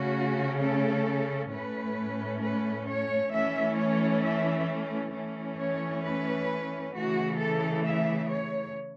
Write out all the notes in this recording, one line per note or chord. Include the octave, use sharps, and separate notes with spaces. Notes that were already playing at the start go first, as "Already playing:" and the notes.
Already playing: C#3 A3 C#4 F#4
A4
A2 A3 C#4 B4
B4
C#5
E3 A3 C#4 E5
C#5
E5
E3 A3 C#4
C#5
B4
C#3 E3 A3 F#4
A4
E5
C#5